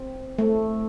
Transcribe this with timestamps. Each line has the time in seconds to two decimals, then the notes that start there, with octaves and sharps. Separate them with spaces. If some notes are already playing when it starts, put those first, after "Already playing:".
Already playing: C4
0.39 A3